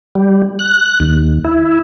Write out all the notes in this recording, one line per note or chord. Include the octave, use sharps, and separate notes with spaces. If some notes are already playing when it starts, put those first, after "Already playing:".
G3
F#6
D#2
E4